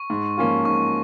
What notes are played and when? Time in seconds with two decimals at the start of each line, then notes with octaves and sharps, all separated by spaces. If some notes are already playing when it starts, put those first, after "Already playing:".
Already playing: C#6
0.10 G#2
0.38 F3 A#3 C#4 F4
0.65 G#2 C#6